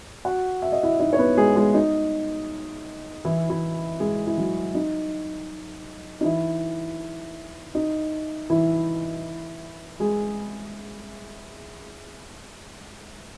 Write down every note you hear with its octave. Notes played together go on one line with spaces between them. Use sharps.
F#4 F#5
E5
D#5
E4 E5
D#4 D#5
C#5
B3 B4
G#3 G#4
G#3 G#4
D#4
E3 E4
E3 E4
G#3 G#4
E4
F#3 F#4
D#4
D#4
E3 E4
D#4
E3 E4
G#3 G#4